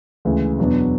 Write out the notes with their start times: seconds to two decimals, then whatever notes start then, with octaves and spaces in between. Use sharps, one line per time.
0.25 D2 C#3 E3 G#3
0.59 E2 B2 F#3 B3 D4